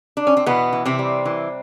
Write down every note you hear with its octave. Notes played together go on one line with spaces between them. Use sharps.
D4
C#4
C4
B2 E3 B3
E3
C3 C4
G3
E3